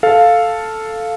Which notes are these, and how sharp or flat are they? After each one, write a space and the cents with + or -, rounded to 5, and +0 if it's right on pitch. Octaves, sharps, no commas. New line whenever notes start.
A4 +0 F5 +0